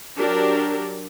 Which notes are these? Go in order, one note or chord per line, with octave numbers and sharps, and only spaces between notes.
F#3 D4 G4 A#4